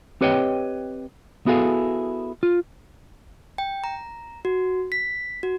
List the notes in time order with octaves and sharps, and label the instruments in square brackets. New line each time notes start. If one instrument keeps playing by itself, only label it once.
[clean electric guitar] C4 G4 B4 C#5 D#5 G5
B3 E4 F#4 G#4 A4 F5
F4
[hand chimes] G5
A#5
F#4
B6
F#4